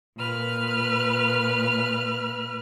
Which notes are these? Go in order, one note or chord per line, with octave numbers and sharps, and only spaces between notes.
A#2 B4 F6